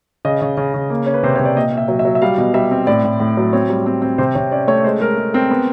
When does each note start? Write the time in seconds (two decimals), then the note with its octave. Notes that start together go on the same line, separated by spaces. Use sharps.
0.25 C#3 D#5
0.42 C#3
0.57 C#3
0.74 C#3
0.90 A#3
1.06 C#4
1.14 B4
1.23 C3 C5
1.35 C3 C#5
1.45 D5
1.56 A#2 D#5
1.72 A#2
1.77 E5
1.88 F#3
1.99 E5
2.05 F#3
2.15 E5
2.22 G3 F5
2.38 B2
2.54 G3 E5
2.71 C4
2.87 A2 D5
3.05 A2
3.20 A2
3.37 F#3
3.53 C4 C#5
3.70 G3
3.86 C4
4.02 C4
4.18 C3 C5
4.35 C3 C#5
4.52 C#4 D5
4.67 A3 C#5
4.84 G#3 C5
5.00 G#3 A#4
5.17 G#3
5.34 C4 A#4
5.51 B3